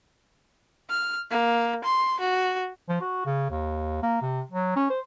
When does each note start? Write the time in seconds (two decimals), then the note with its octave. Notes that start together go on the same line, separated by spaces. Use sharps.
0.90 F6
1.31 A#3
1.84 C6
2.20 F#4
2.89 F3
3.01 F#4
3.26 C#3
3.50 D#2
4.03 A#3
4.22 C3
4.52 F#3
4.76 C#4
4.90 C5